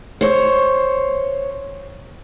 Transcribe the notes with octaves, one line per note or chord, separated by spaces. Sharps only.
C5 C#5